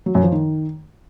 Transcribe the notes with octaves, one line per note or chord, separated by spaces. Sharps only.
F#3
F#2
F3
D#3